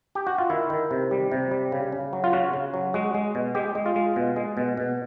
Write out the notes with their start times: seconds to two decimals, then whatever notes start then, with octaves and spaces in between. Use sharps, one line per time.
0.15 G4
0.27 F#4
0.38 F4
0.50 D#3 E4
0.70 D#3
0.91 C3
1.11 G3
1.32 C3
1.51 G3
1.72 C#3
1.92 C#3
2.13 F#3
2.24 F4
2.33 C#3 F#4
2.53 C#3
2.74 F#3
2.94 G#3 F#4
3.14 G#3
3.35 B2
3.55 G#3 G4
3.75 G#3
3.86 F4
3.96 G#3
4.16 B2
4.36 G#3
4.57 B2
4.77 B2